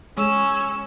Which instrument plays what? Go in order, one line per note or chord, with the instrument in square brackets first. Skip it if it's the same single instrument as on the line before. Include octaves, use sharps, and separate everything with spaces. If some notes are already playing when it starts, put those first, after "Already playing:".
[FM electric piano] G#3 [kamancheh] C#4 [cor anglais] C#5 [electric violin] E6